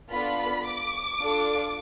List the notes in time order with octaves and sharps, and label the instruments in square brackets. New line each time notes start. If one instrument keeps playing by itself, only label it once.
[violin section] B3 D4 F4 A4 B5
D6
D4 F4 A4